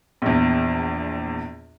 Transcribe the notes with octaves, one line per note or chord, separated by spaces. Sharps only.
A#1 E2